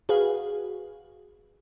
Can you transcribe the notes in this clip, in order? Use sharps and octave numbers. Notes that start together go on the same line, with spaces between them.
F#4 G#4 B4 F5